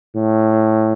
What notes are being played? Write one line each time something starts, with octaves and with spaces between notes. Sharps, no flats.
A2